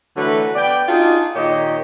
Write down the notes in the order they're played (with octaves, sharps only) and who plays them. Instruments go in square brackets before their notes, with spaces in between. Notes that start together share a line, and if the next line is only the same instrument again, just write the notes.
[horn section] D3 E3 F#3 A3 F#4 B4
B3 D5 G5
D4 D#4 F4 F#4 G#4
A#2 D#3 G4 C#5 D#5